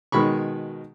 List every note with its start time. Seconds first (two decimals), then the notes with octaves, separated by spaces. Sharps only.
0.12 B2 D#3 G#3 B5 C#6